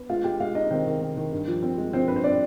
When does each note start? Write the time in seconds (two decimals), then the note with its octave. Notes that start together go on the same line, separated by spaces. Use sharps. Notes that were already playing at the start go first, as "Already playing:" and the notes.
Already playing: B3
0.09 G#3 F4 F5
0.24 G#3 G4 G5
0.40 G#3 F4 F5
0.55 D#4 D#5
0.70 D#3 C4 C5
0.87 D#3
1.01 D#3
1.17 D#3
1.32 G2
1.48 F3
1.63 C4
1.78 G#3
1.93 F3 C4 C5
2.08 G2 B4
2.16 C5
2.24 C4 D4 D5